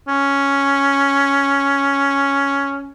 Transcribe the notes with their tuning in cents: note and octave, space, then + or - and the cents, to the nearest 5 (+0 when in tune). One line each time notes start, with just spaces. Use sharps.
C#4 +5